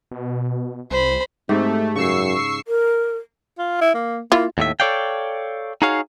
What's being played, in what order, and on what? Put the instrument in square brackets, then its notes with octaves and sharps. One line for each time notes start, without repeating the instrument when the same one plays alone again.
[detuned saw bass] B2
[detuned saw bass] C2 [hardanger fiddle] C5 B5
[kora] G#2 G4 [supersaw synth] A3 [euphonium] C4
[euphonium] F#2 [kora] C#3 C#5 [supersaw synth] C#6 E6 C7
[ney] A#4
[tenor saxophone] F4
E4
A#3
[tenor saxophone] A#3 [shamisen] E4 F4
[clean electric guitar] D#2 A2 E5
A4 C#5 D5 F5 G5
D#4 F#4 G#4 C#5 F5